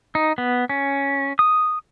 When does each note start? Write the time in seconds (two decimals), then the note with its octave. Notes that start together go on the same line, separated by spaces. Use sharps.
0.15 D#4
0.38 B3
0.69 C#4
1.39 D#6